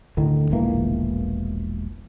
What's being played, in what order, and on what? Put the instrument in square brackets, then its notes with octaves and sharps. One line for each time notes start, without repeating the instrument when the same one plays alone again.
[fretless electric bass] D2 A2 D3 D#3
E1 A#1 E3 A#3